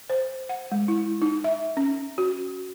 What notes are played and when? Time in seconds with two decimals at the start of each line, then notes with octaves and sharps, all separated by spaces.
0.10 C5
0.49 F#5
0.72 G#3
0.88 E4
1.22 D#4
1.44 E5
1.77 C#4
2.18 F#4